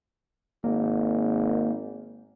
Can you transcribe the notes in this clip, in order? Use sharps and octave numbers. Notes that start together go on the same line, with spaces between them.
G#1 A#3